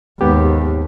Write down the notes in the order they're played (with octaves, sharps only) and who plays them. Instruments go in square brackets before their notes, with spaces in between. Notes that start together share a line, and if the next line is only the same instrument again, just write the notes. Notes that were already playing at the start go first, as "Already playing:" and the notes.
[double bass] D#2 [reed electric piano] G#2 B3 G4